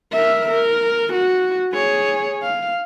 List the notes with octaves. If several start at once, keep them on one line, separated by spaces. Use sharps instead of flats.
A#4 E5
A#4
F#4
G#4 C#5
F5